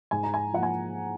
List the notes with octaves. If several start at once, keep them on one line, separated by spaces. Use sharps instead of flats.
G#2 G#5
A#5
G#5
F3 A#3 F#5
G#5